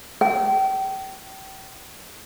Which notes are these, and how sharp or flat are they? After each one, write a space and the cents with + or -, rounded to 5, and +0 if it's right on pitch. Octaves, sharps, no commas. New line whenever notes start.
G5 -30